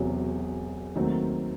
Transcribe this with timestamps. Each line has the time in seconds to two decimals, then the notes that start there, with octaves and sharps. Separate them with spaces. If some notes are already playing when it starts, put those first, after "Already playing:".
Already playing: E1 E2 C3 F#3 C#4
0.95 D#2 D#3 F#3 A3 C4